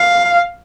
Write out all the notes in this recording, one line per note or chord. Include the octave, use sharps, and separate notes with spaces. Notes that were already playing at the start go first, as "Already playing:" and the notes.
Already playing: F5